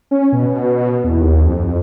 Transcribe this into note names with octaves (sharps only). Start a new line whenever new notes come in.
C#4
B2
E2
D#2
F2
F2